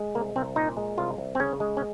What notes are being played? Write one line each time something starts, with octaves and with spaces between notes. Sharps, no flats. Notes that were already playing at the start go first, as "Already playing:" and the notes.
Already playing: G#3
C2 A#3
C2 C4
A#2 D#4
G#3
C2 F4
C2
C4
C#3 C#4
G#3
C#4